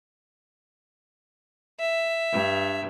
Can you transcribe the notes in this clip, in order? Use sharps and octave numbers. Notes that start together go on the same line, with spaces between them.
E5
G2